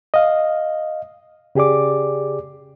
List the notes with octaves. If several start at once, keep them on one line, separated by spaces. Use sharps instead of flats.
D#5 F5
C#3 G4 G#4 D5 D6